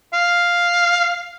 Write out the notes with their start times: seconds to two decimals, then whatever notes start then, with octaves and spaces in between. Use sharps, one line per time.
0.13 F5